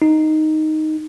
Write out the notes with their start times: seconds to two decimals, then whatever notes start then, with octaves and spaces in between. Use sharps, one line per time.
0.02 D#4